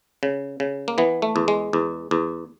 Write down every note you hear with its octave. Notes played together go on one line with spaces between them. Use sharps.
C#3
C#3
A#3
E3 B3
A3
E2
G#3
E2
E2